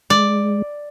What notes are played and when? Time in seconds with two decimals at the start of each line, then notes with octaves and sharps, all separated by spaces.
0.10 G#3 D5